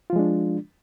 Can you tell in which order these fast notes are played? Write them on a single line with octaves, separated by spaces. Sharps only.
F4 F3 G#3 D4